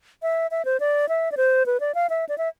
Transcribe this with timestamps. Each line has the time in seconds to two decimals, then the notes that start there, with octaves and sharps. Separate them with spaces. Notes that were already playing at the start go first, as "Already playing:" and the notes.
0.22 E5
0.51 E5
0.65 C5
0.80 D5
1.09 E5
1.32 D5
1.37 C5
1.66 B4
1.80 D5
1.95 F5
2.10 E5
2.29 D5
2.38 E5